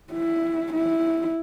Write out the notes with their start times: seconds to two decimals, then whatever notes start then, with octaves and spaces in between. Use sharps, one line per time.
0.13 E4
0.73 E4